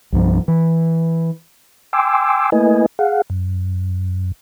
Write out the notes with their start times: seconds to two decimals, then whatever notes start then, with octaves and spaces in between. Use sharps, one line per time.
0.12 C2 G2 F3
0.48 E3
1.93 G5 G#5 C6 D6 E6
2.52 A3 A#3 E4 B4 D#5 G#5
2.99 G#4 F5 F#5
3.30 F#2